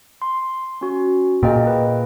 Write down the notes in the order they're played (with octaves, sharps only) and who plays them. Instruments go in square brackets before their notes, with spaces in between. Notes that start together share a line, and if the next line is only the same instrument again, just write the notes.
[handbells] C6
C#4 F#4
[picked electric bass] A#2 [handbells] G#4 D#5 G5
[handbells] B4